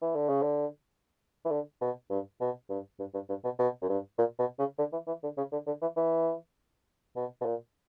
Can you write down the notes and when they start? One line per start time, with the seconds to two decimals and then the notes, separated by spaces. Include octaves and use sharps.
0.02 E3
0.15 D3
0.29 C#3
0.42 D3
1.45 E3
1.51 D3
1.81 B2
2.10 G2
2.41 B2
2.69 G2
2.99 G2
3.14 G2
3.29 G2
3.44 B2
3.59 B2
3.82 F#2
3.89 G2
4.18 A#2
4.39 B2
4.59 C#3
4.79 D3
4.92 E3
5.07 E3
5.23 D3
5.37 C#3
5.52 D3
5.67 D3
5.81 E3
5.97 E3
7.16 B2
7.41 B2
7.46 A#2